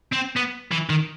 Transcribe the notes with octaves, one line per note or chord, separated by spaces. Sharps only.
C4
B3
E3
D#3